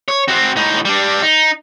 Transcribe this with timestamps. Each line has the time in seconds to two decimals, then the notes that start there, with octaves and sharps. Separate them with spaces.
0.08 C#5
0.28 C4 F#4
0.56 A2 D#4
0.85 G3 D4
1.23 D#4